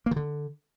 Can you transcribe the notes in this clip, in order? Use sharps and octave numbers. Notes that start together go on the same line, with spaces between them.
A#3
D#3
D3